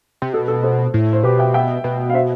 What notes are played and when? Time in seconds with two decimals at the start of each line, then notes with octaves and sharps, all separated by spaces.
0.22 C3
0.33 B2 A4
0.48 A4
0.63 A4 C5
0.94 A2
1.13 C5
1.23 B2 G4 B4
1.39 E5 G5
1.54 E5 G5
1.84 B2
2.10 F5
2.14 C5 E5